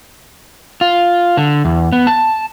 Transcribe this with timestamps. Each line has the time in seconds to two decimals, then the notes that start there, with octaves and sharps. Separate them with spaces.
0.81 F4
1.37 D3
1.65 E2
1.92 B3
2.07 A5